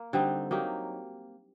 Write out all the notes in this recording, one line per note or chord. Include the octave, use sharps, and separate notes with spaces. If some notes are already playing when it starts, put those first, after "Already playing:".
Already playing: A#3
D3 G3 C4 D#4
F#3 A#3 D#4 G4